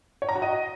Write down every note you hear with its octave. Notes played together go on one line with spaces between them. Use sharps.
C#5
A#5
F#4
D#5